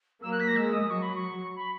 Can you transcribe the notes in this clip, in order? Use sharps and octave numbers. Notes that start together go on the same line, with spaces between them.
F#3 A#3 E6
F#6
B6
A#6
G#3 E6
D#6
F#3 C#6
B5
C#6
B5